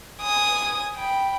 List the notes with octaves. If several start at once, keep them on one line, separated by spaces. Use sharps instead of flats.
G#5 D#6
G5 B5